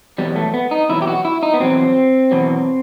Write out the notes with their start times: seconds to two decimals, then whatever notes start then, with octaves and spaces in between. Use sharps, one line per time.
0.18 E2 B2 F#3 G3
0.36 A3
0.54 B3
0.71 D#4
0.89 E2 B2 F#3 E4
1.02 G4
1.07 F#4
1.25 E4
1.43 D#4
1.54 B3
1.60 E2 B2 F#3 C4
2.31 E2 B2 F#3